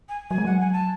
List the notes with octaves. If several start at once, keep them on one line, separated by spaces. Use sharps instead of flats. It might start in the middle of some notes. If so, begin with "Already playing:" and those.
G#5
F#3 G#5
G#3
F#3 F#5
G#5
A5